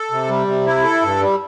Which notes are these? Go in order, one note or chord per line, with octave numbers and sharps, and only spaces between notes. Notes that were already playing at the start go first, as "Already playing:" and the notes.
Already playing: A4
C3
G3
C3
E4
A4
G2
G3